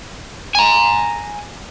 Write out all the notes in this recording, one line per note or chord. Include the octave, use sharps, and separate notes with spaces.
G#5 A#5